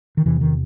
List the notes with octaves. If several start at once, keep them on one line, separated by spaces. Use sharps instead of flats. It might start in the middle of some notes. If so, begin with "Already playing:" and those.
D#3
E2 C3 E3
D#3